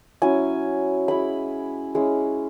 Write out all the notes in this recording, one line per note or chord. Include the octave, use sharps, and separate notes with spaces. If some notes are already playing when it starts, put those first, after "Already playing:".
F#3 C#4 E4 G#5
G#3 E4 B5
G#3 C#4 E4